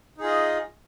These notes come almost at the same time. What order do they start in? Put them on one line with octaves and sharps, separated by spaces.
D#4 G#4 F4 D#5